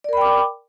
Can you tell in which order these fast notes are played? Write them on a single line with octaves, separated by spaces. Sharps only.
D5 A#4 B5 G5 D6